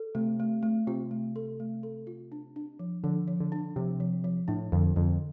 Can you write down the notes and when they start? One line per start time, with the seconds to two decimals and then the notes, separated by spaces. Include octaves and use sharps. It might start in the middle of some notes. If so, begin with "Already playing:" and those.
Already playing: A4
0.15 C3 A3
0.40 A3
0.63 A3
0.87 C3 F4
1.11 A3
1.36 A4
1.60 A3
1.83 A4
2.07 F4
2.32 D4
2.56 D4
2.79 F3
3.04 D3 F3
3.28 F3
3.40 D3
3.52 D4
3.76 C3 F3
4.00 F3
4.24 F3
4.48 A2 D4
4.72 F2 D3
4.96 F2 D3